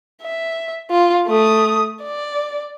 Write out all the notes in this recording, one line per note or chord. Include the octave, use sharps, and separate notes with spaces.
E5
F4
A3 D#6
D5